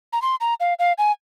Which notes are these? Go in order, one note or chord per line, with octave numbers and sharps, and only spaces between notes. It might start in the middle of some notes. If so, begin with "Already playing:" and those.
A#5
C6
A#5
F5
F5
G#5